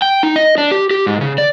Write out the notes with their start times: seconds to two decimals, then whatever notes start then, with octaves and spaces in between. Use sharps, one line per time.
0.02 G5
0.23 D#4
0.36 D#5
0.58 D4
0.72 G4
0.91 G4
1.07 G#2
1.21 C#3
1.38 D5